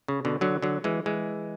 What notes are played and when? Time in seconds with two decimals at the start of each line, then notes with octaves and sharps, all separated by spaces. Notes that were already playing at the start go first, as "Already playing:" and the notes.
0.08 C#3
0.25 B2 D3
0.41 D3 F#3
0.62 D3 F#3
0.84 E3 G#3
1.06 E3 G#3